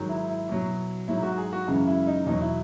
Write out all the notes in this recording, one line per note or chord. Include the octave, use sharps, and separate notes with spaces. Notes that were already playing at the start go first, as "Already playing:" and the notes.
Already playing: G#2 D#3 F#3
E4
E4
B2 F#3
G#2 F#3 E4
F#4
G#4
F#4
F#2 C#3 E3 G#3
E4
D#4
E2 B2 F#3 D#4
E4